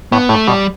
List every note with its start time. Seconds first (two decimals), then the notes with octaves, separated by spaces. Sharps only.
0.12 A2 B3
0.29 A2 A3
0.47 B2 G3